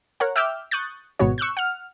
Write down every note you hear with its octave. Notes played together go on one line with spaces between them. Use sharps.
A#4 C#5 F#5
E5 G5 D6 E6 F6 G6
C#6 D#6 F#6 G6 A6
G#1 G#2 B2 B3 F#4 C#5
C#6 E6 F#6 G6
F#5 F6